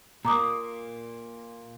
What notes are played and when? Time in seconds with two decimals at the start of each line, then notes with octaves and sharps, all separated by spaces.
0.25 A#2 A#3 A#5 D6 D#6